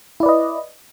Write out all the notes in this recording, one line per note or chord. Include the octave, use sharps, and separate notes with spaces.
E4 B4 D5 D#5